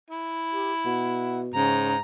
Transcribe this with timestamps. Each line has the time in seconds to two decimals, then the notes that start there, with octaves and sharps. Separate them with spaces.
0.10 E4
0.52 G4
0.85 B2 F#5
1.54 G#2 C#3 A#5